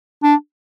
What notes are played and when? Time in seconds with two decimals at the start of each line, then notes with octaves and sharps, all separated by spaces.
0.23 D4